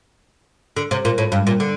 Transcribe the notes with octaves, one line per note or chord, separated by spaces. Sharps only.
D3
C3
A#2
A2
G2
A#2
D3